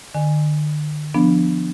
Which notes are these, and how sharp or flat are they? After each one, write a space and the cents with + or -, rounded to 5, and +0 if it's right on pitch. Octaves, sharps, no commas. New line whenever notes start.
D3 +45 G#5 +0
F3 +5 B3 +0 D4 +0